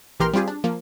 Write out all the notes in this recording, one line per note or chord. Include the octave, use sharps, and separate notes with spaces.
A#1 E3 G4 A#4 C6 F6
G3 C4 F4 G4 G#4
D4
F3 A#3